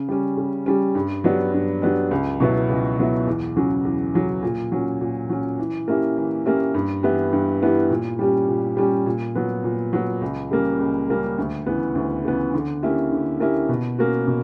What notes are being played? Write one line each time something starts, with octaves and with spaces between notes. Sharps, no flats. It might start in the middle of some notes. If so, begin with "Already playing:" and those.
Already playing: C#3
G3 C#4
C#3
G3 C#4
G2
F#3 B3 D4 G4
G2
F#3 B3 D4 G4
C#2
B2 F#3 B3 E4
C#2
B2 F#3 B3 E4
E2
C#3 F#3 C#4
E2
C#3 F#3 C#4
A#2
F#3 C#4
A#2
F#3 C#4
E3
A#3 C#4 E4 G4
E3
A#3 C#4 E4 G4
G2
E3 B3 E4 G4
G2
E3 B3 E4 G4
A#2
G3 C#4 G4
A#2
G3 C#4 G4
A#2
F#3 B3
A#2
F#3 B3
C#2
C#3 G3 A#3 C#4
C#2
C#3 G3 A#3 C#4
D2
C#3 E3 B3
D2
C#3 E3 B3
D3
A#3 C#4 E4 G4
D3
A#3 C#4 E4 G4
B2
A#3 C#4 F#4
B2